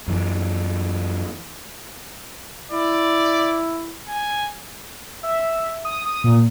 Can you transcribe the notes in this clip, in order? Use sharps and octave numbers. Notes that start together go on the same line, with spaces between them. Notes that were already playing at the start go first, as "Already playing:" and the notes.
F#2 E3
E4 D5
G#5
E5
D#6
D#6
A#2